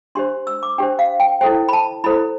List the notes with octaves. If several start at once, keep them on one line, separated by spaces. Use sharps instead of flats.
D4 G4 C5 C6
E6
D6
D4 G4 C5 G5
F5
G5
E4 A4 C5 G5
B5
A5
E4 A4 C5 B5